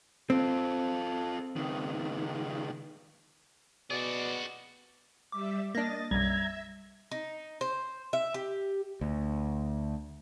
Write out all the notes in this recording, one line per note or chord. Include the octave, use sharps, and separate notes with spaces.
C4 F4 A4
C#2 D#3
B2 F#4 G#4 D5
G3 E5 D6
A#3 D4 D#5 A6 A#6
B1 F#2 G3 E5 A#5 G#6
D#4
C5
E5
G4
D2